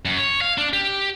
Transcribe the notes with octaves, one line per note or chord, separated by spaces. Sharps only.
F#2
C#5
F5
D4
G4